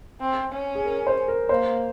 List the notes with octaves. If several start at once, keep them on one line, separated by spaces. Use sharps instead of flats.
C4
C#4
G#4
A#4
C5
A#4
A#3 C5